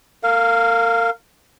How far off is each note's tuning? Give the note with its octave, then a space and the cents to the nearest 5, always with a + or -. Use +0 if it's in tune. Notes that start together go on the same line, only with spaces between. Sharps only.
A#4 -35 F5 +0